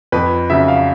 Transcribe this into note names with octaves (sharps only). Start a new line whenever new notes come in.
F2 B4
C#3 F#3 E5
F5